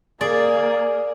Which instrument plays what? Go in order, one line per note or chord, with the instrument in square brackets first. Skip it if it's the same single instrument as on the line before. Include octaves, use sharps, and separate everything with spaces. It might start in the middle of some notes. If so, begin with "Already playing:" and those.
[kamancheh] A#3 A#4 [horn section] G#4 [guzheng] D5